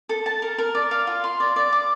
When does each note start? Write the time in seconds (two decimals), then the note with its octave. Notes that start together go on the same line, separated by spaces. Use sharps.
0.09 A4
0.26 A5
0.42 A#4
0.58 A#4
0.75 D5
0.91 F5
1.07 F4
1.24 C6
1.40 D5
1.56 D5
1.73 D6